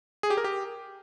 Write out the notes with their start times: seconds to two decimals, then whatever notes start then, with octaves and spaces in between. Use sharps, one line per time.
0.23 G#4
0.30 G4
0.37 A#4
0.44 G4